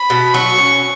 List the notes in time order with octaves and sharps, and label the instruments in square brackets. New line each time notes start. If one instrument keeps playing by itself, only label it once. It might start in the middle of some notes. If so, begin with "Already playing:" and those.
Already playing: [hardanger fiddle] B5
[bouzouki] B2
[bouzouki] F#3 [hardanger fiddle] C#6
[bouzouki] C#4